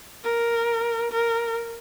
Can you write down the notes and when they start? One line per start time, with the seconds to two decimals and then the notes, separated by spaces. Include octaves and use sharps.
0.24 A#4
1.12 A#4